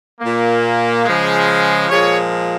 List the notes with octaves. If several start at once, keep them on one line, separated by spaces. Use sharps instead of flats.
A#2 A#3
C#3 F3 G#3
A#2 F3 G#3 G#4 C#5